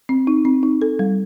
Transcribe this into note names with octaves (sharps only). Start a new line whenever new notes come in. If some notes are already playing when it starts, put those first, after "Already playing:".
C4
D#4
C4
D#4
A4
G3